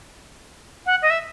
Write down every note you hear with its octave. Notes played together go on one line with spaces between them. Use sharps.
F#5
D#5
E5